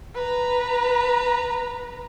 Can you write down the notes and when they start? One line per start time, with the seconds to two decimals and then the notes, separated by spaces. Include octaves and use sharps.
0.14 B4 A#5